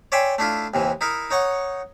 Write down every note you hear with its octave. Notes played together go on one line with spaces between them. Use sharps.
C#5 D5 E5 G5 G#5 C6
A3 D4 E4 F4
D#2 C3 E3
D#4 E4 A#4
D#4 C#5 F#5 C#6